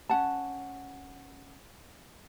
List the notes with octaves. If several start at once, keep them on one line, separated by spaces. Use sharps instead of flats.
C#4 F#5 A5